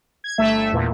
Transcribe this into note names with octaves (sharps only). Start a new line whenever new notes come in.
G#6
G1 A3 E5
E2 A#2